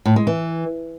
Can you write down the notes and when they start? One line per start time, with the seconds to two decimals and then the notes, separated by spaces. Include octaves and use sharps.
0.06 A2
0.16 G#3
0.27 E3